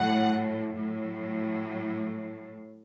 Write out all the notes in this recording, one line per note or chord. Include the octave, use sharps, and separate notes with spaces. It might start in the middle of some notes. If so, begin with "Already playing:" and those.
Already playing: A2 F#3 F#5
A2 F#3